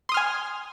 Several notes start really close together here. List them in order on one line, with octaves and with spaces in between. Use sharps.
C6 D#6 F6 G#5